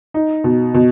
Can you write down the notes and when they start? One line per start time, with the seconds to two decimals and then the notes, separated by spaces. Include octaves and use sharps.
0.14 D#4
0.44 B2
0.74 B2